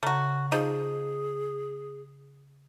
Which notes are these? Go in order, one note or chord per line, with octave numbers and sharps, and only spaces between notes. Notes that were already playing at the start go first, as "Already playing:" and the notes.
C#3 A3 F#4 A#5
F3 D#4 G#4